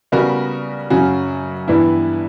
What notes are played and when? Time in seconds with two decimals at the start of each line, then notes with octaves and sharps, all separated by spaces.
0.12 C#3 G3 B3 F#4 A#4
0.90 F#2 C#3 F#3 C#4 F#4
1.68 G2 E3 G3 B3 E4